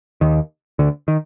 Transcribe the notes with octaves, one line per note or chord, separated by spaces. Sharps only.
D#2 D#3
D2 D3
D#3